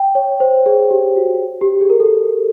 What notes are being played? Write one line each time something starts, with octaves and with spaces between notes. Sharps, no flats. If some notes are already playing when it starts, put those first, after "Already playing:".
Already playing: G5
C#5
C5
G#4
G4
F#4
G4
G#4
A#4
A4